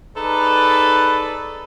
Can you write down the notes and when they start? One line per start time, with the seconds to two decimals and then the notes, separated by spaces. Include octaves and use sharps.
0.16 D#4 G#4 A4 B4 D5